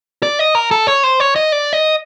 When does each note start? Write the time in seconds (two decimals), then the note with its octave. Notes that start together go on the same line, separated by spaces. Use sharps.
0.23 D5
0.39 D#5
0.55 A#4
0.71 A4
0.87 C#5
1.03 C5
1.20 C#5
1.36 D#5
1.52 D5
1.73 D#5